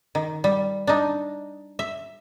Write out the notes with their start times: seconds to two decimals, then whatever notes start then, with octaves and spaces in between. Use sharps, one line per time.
0.15 D#3
0.44 G3
0.87 D4 D#4
1.79 E5